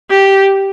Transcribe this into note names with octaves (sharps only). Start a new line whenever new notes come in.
G4